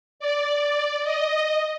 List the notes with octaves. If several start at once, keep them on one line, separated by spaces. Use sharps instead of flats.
D5
D#5